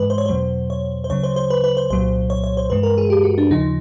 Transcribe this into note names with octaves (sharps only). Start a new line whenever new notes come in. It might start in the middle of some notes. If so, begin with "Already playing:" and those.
Already playing: G#2 E3 G#3 B4
C5
C#5
E2 B2 F#3 C5
C#5
C5
D2 C#3 F#3 C#5
C5
C5
B4
B4
C5
C2 A#2 F#3 C5
C#5
C#5
C5
G2 E3 G#3 B4
A#4
G#4
G4
F#4
D4
D#2 C#3 F3 D#4